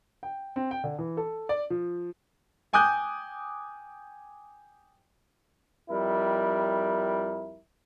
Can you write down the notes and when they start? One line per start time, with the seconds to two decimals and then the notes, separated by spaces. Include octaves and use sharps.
0.23 G5
0.56 C4
0.71 G5
0.84 D3
0.99 E3
1.17 A4
1.49 D5
1.70 F3
2.73 G5 G#5 D6 D#6 F#6 G6
5.89 F2 G3 E4 A#4